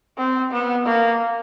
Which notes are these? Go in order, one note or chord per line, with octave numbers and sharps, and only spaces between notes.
C4
B3
A#3